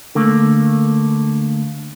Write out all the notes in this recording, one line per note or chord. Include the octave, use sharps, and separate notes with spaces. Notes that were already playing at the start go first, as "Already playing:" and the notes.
D3 A3 A#3